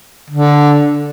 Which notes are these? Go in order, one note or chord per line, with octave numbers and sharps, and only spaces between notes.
D3